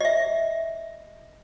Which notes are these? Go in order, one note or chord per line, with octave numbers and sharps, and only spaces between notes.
D#5 E5